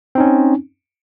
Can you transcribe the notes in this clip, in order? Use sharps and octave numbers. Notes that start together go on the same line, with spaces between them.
C4 C#4 D#4